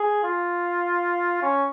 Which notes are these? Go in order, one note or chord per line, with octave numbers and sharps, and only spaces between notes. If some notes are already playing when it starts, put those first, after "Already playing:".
Already playing: G#4
F4
C#4